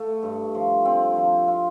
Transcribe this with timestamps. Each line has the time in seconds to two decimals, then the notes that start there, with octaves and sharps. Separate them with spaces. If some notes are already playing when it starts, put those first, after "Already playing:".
Already playing: A3
0.23 G2
0.55 F3
0.85 C4
1.16 F3
1.48 F4